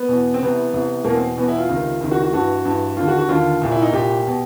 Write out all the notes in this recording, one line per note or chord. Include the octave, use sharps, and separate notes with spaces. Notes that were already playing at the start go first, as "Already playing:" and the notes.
Already playing: B3
E2 B2
C4
C2 C3 E3 B3
C2 C3 E3
E2 B2 A#3
C4
E2 B2 B3
E4
F4
C#2 C3 D#3
C#2 C3 D#3
F#4
F#4
G2 E3 F#4
G2 E3
D#2 D3 F4
F#4
F#4
D#2 D3 F4
C2 A#2
E4
D#4
C2 A#2 G4
B2